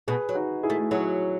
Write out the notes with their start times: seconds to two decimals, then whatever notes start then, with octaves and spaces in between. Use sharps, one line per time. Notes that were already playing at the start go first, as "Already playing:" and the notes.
0.07 B2 G#4 B4
0.29 F#3
0.35 D#4 F#4
0.63 E4 G#4
0.70 A3
0.91 F#3 E4 G#4